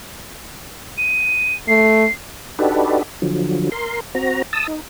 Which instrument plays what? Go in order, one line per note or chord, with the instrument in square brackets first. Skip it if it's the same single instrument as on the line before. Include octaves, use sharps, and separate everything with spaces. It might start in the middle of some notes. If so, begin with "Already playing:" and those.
[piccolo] D#7
[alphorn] A3 [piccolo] C7
[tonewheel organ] D4 D#4 F#4 G4 A4 B4
D3 F3 F#3
A#4 C6
C4 F#4 A#5
A5 D#6 E6
D#4